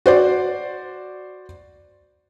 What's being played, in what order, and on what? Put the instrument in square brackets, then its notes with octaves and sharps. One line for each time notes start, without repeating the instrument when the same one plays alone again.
[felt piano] F#4 C5 D5